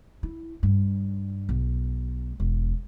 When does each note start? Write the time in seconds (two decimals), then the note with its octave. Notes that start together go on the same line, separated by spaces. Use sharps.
0.23 E4
0.63 G2
1.49 B1
2.40 E1